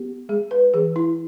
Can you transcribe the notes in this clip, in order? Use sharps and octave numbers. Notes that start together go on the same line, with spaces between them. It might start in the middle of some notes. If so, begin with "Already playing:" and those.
Already playing: B3 G4
G#3 G#4
B4
E3 G#4
E4